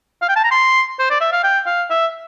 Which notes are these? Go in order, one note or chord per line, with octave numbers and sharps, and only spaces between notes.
F5
G5
A5
A#5
C6
C5
D5
E5
F5
G5
F5
E5